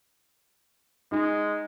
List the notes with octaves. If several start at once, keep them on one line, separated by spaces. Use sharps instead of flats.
G#3 D#4